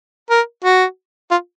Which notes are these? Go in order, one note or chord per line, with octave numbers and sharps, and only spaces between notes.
A#4
F#4
F4